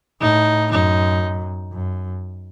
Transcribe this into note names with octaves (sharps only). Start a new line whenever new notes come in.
A2 D#4
F#2 D#4
F#2